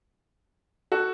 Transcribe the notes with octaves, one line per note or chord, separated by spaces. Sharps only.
F#4 A4